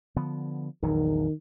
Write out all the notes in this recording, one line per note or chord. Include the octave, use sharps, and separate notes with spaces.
D3 F3 B3
A#1 E2 D#3 F#3